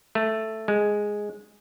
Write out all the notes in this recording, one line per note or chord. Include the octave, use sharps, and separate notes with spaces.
A3
G#3